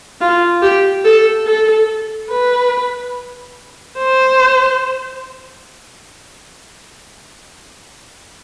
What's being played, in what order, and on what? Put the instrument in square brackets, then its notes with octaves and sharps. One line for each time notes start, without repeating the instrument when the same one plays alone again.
[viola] F4
G4
A4
A4
B4
C5